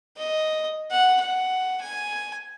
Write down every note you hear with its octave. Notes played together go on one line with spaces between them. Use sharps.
D#5
F#5
F#5
G#5